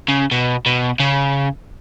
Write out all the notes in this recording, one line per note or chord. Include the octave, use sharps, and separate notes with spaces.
C#3
B2
B2
C#3